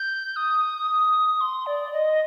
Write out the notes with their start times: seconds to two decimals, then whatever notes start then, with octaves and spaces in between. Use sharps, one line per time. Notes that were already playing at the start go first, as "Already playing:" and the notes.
Already playing: G6
0.36 D#6
1.41 C6
1.66 D5
1.93 D#5